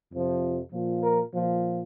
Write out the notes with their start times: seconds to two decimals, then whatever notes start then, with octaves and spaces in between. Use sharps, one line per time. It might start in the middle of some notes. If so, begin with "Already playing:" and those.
0.11 F2 C3 F3
0.72 A#2 F3
1.02 A#4
1.32 A#2 F3